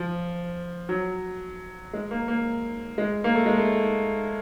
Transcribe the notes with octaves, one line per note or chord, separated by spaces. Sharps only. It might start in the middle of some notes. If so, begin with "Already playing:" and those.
Already playing: F3
F#3
G#3
A#3
A#3
G#3
A#3
A3
G#3
A3